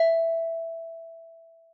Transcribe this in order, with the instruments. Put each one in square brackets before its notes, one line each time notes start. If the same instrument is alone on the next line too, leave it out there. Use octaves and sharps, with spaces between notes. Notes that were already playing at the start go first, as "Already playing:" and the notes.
Already playing: [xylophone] E5